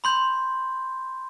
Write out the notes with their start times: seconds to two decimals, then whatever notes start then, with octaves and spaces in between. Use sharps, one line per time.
0.04 B5 C6 G6